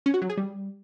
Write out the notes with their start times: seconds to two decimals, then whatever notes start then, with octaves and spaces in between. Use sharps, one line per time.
0.06 C#4
0.14 F#4
0.22 F#3
0.30 G#4
0.37 G3